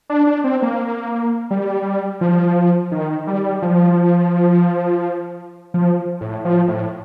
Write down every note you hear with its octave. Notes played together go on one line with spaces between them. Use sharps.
D4
D4
C4
A#3
G3
F3
D#3
G3
F3
F3
A2
F3
A2